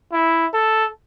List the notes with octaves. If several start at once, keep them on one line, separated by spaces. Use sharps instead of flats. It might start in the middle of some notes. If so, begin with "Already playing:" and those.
E4
A4